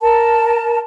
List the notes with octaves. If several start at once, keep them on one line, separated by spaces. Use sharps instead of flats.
A#4 A5